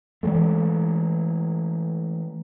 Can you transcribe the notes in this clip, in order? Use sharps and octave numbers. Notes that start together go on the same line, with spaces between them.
E3 F3 G#3 A3